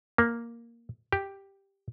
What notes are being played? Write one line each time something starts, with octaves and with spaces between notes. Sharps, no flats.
A#3
G4